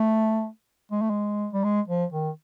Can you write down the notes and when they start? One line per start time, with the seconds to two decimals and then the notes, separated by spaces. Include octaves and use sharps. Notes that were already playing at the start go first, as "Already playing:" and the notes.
Already playing: A3
0.92 G#3
1.02 A3
1.10 G#3
1.53 G3
1.64 G#3
1.88 F3
2.13 D#3